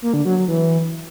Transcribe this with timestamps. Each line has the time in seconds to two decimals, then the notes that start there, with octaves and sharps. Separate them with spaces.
0.02 A#3
0.14 D3
0.25 F#3
0.37 F#3
0.48 E3